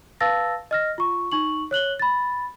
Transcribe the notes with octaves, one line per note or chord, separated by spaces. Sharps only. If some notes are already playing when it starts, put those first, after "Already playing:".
B4 F5 A5 E6 A6 A#6
D#5 F6 A#6
F4 C#6
D#4 C#6 F#7
C#5 F#6 F#7 G7
B5 A6